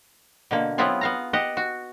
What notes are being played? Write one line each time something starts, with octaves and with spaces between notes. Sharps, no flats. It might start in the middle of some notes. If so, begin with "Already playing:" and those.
B2 D3 A#3
F#3 B3 C4 E4 F4 G#4
B3 F5 A#5
G4 D#5 F#5
F#4